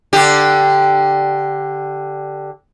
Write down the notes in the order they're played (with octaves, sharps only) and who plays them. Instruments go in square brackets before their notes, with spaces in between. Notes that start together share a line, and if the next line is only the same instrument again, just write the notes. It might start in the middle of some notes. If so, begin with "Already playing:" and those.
[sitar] D3 G4